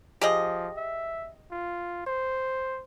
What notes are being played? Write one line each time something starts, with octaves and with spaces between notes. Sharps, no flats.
F3 G4 G#4 D#5
E5
F4
C5